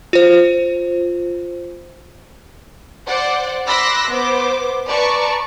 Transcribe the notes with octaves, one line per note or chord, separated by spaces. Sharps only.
F4 C5
C5 D5 F#5
B5 C6 D6 E6 F#6 A#6
B3 C5 D6
B4 D5 A5 A#5 C#6